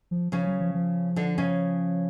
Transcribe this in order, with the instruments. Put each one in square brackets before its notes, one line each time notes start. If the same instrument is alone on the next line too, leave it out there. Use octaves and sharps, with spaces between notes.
[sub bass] F3
[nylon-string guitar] C#3 C#4 [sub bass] F3
[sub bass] F#3
F3
F3
[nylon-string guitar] D3 D4
C#3 C#4